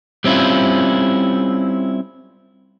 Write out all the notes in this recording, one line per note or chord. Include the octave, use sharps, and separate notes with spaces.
G3 C4 C#4 E4 F4